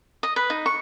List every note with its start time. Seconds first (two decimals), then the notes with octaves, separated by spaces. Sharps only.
0.23 D#5
0.36 B4
0.50 D#4
0.66 C#6